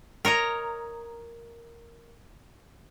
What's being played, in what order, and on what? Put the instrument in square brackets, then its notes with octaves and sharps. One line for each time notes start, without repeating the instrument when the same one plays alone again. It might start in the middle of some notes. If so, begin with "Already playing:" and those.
[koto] A#4 C#5 D#5 A#5